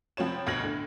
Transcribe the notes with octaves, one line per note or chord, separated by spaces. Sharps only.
F1 F3 C4 F#4 C#5 E7
D2 B2 F6 G#6 A#6 F#7
A2 D3